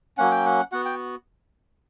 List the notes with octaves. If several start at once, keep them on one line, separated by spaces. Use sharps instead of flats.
F#3 A#3 C#4 F#5
G5
F#5
B3 F#4 F#5
G5